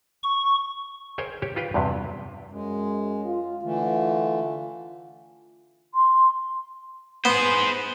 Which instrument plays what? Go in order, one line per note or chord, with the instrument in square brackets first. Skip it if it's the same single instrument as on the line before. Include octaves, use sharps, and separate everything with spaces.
[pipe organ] C#6
[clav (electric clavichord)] G#4 A#4 C5 C#5 G5 G#5
G4 C#5
F4 G4 B4 F5 G5
E2 G2 C3 F#3
[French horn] F#2 [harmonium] G#3
[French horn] F4
[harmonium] D3 E3 A3 [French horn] F4
[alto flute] C6
[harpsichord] B3 [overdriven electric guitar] G#4 C5